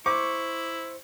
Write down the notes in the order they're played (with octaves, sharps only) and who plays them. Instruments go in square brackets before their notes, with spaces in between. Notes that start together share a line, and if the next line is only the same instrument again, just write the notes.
[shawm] E4 [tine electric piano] C5 [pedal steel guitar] C#6 [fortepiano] D6